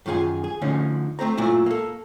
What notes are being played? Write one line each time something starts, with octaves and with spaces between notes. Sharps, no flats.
F#2 D#3 F4 G4 G#4
G#4
D2 D3 F3 C#4 D#4
A3 C4 C5 A#5
A#2 F#3 A3 E4
A#3 A4